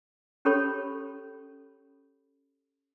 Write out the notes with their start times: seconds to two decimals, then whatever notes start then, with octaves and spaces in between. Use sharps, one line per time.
0.45 C#4 G4 A4 C#5 B5